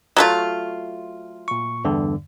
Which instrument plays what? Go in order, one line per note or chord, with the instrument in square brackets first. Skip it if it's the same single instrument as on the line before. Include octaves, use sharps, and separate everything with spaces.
[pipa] F#3 A3 F4
[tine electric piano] A#2 C#6
E2 G2 D3